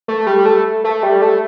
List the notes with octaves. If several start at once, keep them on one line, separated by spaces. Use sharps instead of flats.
A3
G3
A3
A3
G3
A3